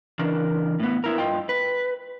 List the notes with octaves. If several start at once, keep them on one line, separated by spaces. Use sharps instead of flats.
C#3 E3 D4 A#4
A2 B3
B3 E4 A#4
G2 F4 D#5 G5
B4